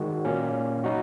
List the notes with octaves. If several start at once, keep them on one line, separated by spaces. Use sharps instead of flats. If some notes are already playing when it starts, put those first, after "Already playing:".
Already playing: D#3 G#3 F#4
A#2 A#3 C#4
F#3 D#4 F#4